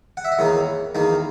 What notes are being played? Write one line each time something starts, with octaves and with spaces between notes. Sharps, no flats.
F#5
E5
D#5
E2 D#3 A#3 D#4 C#5
E2 D#3 A#3 D#4